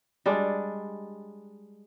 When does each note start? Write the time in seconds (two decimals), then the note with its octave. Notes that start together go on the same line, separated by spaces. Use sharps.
0.26 G3 G#3 D4